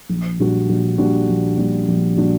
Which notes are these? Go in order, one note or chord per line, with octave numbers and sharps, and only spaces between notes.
A#1
A#2 G3 D4 F#4
A#1
A#2 G3 D4 F#4
A#1
A#2 G3 D4 F#4
A#1
A#2 G3 D4 F#4